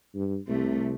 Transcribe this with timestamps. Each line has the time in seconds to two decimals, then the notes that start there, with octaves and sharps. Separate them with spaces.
0.15 G2
0.48 C2 C3 A3